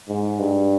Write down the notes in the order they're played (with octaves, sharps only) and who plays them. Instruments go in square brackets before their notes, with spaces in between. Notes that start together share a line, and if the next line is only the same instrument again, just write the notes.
[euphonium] G#2
G2